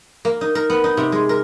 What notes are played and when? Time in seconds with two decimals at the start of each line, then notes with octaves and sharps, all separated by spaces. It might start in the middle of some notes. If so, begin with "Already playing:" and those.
0.25 A#3
0.41 D#4
0.55 A#4
0.70 B3
0.84 D#4
0.97 C3
1.12 G#3
1.29 A#4